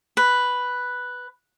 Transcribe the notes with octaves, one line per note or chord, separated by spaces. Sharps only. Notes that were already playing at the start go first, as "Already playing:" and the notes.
B4